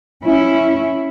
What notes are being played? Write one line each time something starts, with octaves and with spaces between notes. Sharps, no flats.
C#4 E4